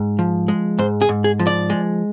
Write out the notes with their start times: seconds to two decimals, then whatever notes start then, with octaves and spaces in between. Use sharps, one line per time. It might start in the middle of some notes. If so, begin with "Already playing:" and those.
Already playing: G#2
0.19 F3
0.48 G#3
0.79 G#2 C5
1.02 G#4
1.09 G#2
1.24 G#4
1.39 F3
1.47 D5
1.70 G#3